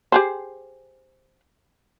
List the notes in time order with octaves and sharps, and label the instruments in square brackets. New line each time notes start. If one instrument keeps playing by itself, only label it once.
[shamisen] G4 G#4 C5